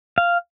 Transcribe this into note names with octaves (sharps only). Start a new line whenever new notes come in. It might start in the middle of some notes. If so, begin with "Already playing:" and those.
F5